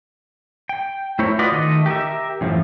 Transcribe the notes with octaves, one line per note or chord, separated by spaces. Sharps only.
G5
A3 E4 A#4 C5 C#5
F4 F#4 B4 D5 D#5
D#3 A3 D#5
G4 A#4 D#5 E5
F#2 A2 E3 F3